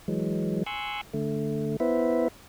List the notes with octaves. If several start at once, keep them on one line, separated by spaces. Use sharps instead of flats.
E3 F#3 G#3
G#5 C6 C#6 E6 F#6
D3 A3
B3 E4 B4 C5 E5